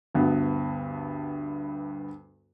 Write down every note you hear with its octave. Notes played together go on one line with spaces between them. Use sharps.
D2 G2 B3